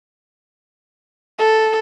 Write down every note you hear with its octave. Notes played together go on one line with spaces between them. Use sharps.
A4